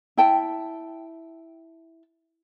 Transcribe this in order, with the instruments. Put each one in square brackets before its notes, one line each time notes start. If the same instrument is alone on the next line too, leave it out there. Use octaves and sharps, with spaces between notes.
[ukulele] E4 G5 A5